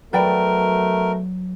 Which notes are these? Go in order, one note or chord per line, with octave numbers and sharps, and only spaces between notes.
B2 F#3 A3 A#4 B4 D5 G5